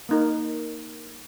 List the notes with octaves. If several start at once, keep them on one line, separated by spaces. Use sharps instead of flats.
A#3 D#4 A#4